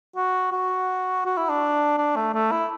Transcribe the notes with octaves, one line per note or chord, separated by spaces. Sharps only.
F#4
F#4
F#4
E4
D4
D4
A3
A3
E4